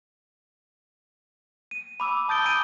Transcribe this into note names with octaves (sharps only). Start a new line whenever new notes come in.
D#7
B5 D6 E6 D#7
A5 D#6 G6 A6 D7 G7
G#5 A#5 D6 D#6 D7 D#7